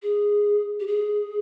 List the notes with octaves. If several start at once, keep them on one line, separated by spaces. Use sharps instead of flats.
G#4
G4
G#4